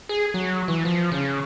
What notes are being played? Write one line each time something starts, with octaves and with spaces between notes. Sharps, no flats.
G#4
F#3
E3
F3
C#3